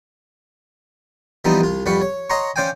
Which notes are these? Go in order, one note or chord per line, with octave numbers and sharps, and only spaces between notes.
E3 F3 G3 B3 C4 D#4
C2 F4
F2 G3 B4 F5 F#5 C#6
C#5
C#5 D#5 F#5 A#5 C6 C#6
C#4 C5 D5 F5 G5 G#5